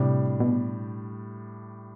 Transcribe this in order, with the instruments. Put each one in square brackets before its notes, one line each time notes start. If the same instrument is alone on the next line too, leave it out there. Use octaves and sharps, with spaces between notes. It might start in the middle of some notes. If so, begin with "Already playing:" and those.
Already playing: [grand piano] A2 G3 D4 G4 [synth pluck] C3
[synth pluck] B2